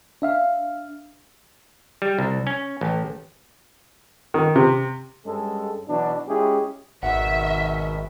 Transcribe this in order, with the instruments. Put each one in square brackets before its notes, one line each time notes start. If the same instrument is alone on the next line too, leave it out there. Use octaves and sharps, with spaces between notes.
[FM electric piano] D4 E5 F5
[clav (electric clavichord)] G3
C2
C#4
A1
[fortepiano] D#3
C3
[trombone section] G2 G#3 C#4 G#4 A4
B2 E3 F#3 D4
G#3 C#4 E4 F4 G4 G#4
[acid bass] G#1 [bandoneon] B2 D#3 [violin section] E5 [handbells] F#5